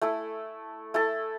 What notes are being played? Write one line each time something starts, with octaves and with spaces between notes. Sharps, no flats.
A3 E4 A4
A3 E4 A4